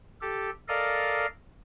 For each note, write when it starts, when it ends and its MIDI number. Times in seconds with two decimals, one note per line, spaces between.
0.21 0.50 67
0.21 0.50 69
0.68 1.26 69
0.68 1.26 70
0.68 1.26 74
0.68 1.26 75
0.68 1.26 77